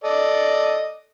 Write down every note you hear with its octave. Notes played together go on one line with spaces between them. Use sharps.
A4 D5 D#5